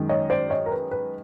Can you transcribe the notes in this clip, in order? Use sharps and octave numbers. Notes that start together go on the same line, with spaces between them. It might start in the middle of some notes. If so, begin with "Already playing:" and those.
Already playing: F#2 D#3 G#3
C#5 D#5
C5 D5
C#5 D#5
A#4
B4
B4